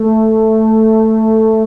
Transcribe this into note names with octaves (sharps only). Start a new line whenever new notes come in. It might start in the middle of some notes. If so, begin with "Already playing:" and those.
Already playing: A3